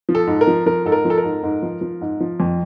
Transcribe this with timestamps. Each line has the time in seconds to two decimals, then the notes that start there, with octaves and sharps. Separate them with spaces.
0.09 F3
0.15 A4
0.27 G#2
0.41 A#4
0.47 F3
0.66 F3 A#4
0.85 G#2 A4
0.92 A#4
1.05 F3
1.10 A4
1.18 A#4
1.24 G#2
1.43 G#2
1.62 F3
1.81 F3
2.01 G#2
2.20 F3
2.40 F2